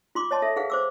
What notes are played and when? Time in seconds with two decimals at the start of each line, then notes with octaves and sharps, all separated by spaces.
0.15 F4 C6 D6
0.31 C#5 D#5 A5 C6
0.42 A4 E5
0.56 G#4 B4 F5 F#5
0.70 C5 D6 E6